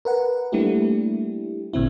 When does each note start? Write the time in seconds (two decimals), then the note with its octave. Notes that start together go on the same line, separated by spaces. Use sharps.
0.05 A#4 B4 F#5
0.52 G3 A3 A#3 D4 E4 G4
1.73 G#1 A#2 D3 C4 E4